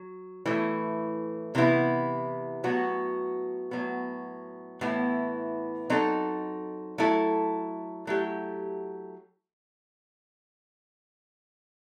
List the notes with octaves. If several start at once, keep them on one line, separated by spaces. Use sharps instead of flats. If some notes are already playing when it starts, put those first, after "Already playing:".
Already playing: F#3
A2 E3 A3
C3 E3 B3 E4
A2 F#3 B3 F#4
A2 F#3 B3
A2 E3 B3 E4
F#3 C4 D#4 A4
F#3 A3 E4 A4
F#3 A3 E4 G4